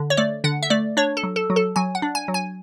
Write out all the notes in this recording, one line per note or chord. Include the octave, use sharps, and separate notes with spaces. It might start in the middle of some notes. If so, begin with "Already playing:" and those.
Already playing: D3
C#5
A3 D5
D3 F#5
E5
A3 D5
D4 C#5
A4
F#3
A4
F#3
A4
F#3 G#5
F#5
D4
G#5
F#3
G#5